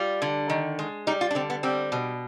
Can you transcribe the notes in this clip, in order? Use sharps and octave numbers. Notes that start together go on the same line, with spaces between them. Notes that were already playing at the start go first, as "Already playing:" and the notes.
Already playing: G3 F4
D3
D#3
G#3
G3 D#4
F4
D4
D3 C4
B3
G3 C4
B2